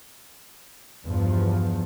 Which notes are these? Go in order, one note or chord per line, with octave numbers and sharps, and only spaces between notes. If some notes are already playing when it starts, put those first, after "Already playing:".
E2 G2 F3